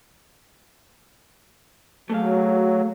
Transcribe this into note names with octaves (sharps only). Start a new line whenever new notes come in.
F#3 A3 G#4 F5